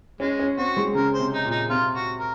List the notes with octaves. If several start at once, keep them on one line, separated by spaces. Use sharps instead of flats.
G#3 C#4
C#4
C4 F#4
G#3
C#3 A#4
C5
C3
D#4
A#2
D#4
C3 F4
F#4
A#4